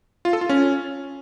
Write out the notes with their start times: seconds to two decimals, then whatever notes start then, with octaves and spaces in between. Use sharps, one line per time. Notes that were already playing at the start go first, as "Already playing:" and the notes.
0.25 F4
0.33 A4
0.41 F4
0.49 C#4